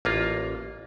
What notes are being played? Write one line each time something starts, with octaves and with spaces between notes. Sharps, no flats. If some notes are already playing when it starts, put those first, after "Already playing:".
A1 A#3 F4